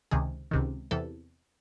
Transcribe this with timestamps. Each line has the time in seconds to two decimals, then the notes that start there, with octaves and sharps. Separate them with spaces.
0.11 C#2 C3 D#3 G#4
0.51 C#2 C3 D#3
0.91 E2 C3 E3 A4